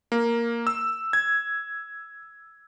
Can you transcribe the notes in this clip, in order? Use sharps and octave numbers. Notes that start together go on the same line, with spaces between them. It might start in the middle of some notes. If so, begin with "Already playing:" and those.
A#3
E6
G#6